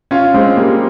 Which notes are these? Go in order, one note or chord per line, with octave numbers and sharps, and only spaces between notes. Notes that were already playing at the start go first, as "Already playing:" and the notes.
C#4 F4
G#3 C4
G3 A#3